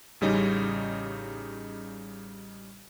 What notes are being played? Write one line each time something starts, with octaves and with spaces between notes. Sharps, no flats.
A1 C#3 G3 C#4 D#4